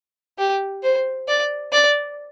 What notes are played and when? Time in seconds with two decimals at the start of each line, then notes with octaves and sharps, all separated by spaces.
0.38 G4
0.83 C5
1.28 D5
1.72 D5